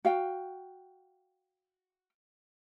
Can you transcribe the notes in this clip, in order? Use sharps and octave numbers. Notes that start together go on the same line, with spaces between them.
F#4 F5 G5